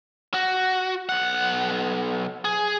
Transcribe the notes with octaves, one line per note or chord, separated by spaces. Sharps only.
F#4
B1 F#5
G#4